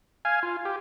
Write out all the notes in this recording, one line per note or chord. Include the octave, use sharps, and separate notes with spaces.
F5 G#5
F4
G4